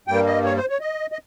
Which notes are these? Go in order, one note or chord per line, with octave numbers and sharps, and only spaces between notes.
G2 G3 A#3 G5
D#5
C#5
C5
C#5
D#5
D#5